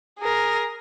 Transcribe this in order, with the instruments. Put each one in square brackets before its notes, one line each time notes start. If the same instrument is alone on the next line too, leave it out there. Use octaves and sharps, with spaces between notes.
[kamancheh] G#4 A#4